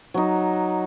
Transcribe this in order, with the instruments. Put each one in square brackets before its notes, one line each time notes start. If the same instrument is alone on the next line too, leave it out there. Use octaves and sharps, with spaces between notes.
[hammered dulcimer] F#3 D#4